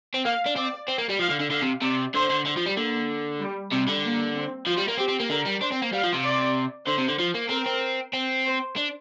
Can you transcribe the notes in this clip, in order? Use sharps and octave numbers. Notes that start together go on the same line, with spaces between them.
C4
A#3 F5
D4
C4 D5
C4
A#3
G3
F3 F5
D3
D3
D3 F5
C3
C3 D5
D3 C5
D3
D3
F3
G3
D3 A#3
G3
C3 G3
D3
A#3
C4
F3 F4
G3
A#3
C4 G4
C4
A#3
D3 A#4
G3
D4 C5
C4
A#3
G3 F5
F3
C3
D5
D3 C5
C3
D3
F3
A#3
C4 A#4
C4
C4
C5
D4